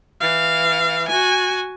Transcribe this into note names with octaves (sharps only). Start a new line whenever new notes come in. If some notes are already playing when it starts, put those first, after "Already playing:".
E3 F5
F#4 G#5